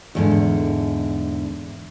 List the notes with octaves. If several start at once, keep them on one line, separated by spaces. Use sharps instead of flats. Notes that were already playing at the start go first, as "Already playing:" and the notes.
E2 G#2 D3